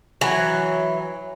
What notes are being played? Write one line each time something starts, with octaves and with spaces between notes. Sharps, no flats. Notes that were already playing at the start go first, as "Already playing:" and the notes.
E3 F#3